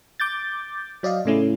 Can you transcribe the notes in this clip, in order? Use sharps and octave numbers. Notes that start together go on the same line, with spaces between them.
D6 G6 A6
F#3 D5 D#5 F5
A2 C#3 A3 C#4 E4